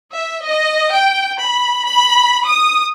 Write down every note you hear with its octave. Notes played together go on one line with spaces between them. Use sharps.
E5
D#5
G5
B5
B5
D#6